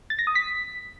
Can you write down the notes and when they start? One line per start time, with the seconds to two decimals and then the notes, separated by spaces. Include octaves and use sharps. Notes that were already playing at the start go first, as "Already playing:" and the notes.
0.10 A6
0.19 A#6
0.27 D#6
0.35 B6